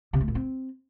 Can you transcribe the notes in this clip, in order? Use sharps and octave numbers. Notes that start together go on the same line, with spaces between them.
C3
A3
A#2
C4